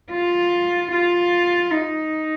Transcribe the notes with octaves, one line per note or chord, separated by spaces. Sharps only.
F4
F4
D#4